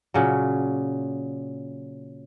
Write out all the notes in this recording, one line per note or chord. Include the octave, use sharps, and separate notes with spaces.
A#2 C#3 F#3